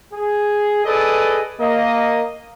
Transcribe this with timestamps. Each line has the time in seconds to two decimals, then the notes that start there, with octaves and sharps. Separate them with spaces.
0.13 G#4
0.85 G#4 A4 B4 D5 D#5
1.60 A#3 D#5